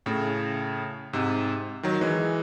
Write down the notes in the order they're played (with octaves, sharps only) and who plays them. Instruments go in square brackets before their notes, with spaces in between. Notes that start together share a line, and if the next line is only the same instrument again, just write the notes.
[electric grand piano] A2 C#3
G#2 C3
D#3 F#3
E3 G#3